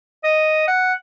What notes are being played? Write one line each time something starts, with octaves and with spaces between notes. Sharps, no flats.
D#5
F#5